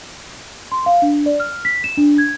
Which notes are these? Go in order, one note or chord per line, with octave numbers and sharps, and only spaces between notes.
C6
F5
D4
D5
F6
B6
E7
D4
G#6